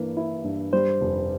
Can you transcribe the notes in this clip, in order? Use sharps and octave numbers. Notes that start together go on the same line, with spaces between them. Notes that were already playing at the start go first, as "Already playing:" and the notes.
Already playing: G2 E3 A#3
E4
G2
G3 C5
F1